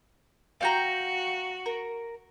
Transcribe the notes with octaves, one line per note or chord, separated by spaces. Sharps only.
F#4 F5 G5 A#5
A#4